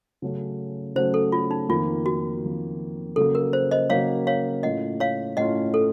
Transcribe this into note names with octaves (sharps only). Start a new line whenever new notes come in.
C#3 F#3 A3 C#4
C#3 F#3 A3 C#4 C5
A4
F4
D#4
F2 D#3 A#3 F4
F#4
F2 D#3 A#3
C#3 F#3 A#3 A4
A#4
C5
C5 D#5
C#3 F#3 A#3 C#5 F5
C#5 F5
A2 A3 C#4 F4 D#5 F#5
C#5 F5
A2 A3 C#4 F4 D#5 F#5
A4